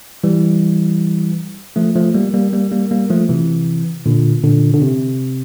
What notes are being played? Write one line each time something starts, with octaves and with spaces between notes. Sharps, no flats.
E3 G3
F3 A3
F3 A3
G3 A#3
G3 A#3
G3 A#3
G3 A#3
G3 A#3
F3 A3
C3 E3
A#2 D3
A#2 D3
D3
C3